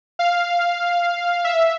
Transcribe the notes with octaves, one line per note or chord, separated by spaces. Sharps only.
F5
E5